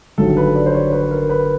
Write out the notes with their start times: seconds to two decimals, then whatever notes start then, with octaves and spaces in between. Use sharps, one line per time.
0.18 G1 G2 D#3 F#3 A4
0.37 B4
0.55 D5
0.66 C5
0.74 C#5
0.92 B4
1.11 A#4
1.29 B4